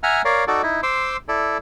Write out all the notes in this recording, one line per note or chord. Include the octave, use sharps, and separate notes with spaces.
E5 F#5 G#5 A#5 F6
A#4 C#5 D5 F5
D#4 F#4 A4 D5
D#4 E4
C5 C6 D6 E6
E4 A4 D5